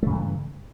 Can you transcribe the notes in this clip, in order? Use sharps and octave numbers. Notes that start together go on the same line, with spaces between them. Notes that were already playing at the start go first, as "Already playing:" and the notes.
G2 C#3 E3 A3